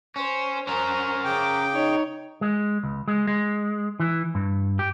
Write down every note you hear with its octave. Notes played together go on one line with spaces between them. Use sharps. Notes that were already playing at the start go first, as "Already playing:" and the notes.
C#4 C5
C#4 A#4 C5 A#5
C#3 G5 D6
D#4 C#5
G#3
C#2
G#3
G#3
E3
G2
G4